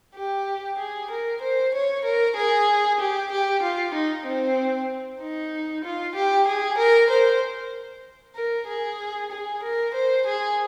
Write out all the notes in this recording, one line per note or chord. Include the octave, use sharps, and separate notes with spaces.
G4
G#4
A#4
C5
C#5
A#4
G#4
G4
G4
F4
D#4
C4
D#4
F4
G4
G#4
A#4
C5
A#4
G#4
G#4
A#4
C5
G#4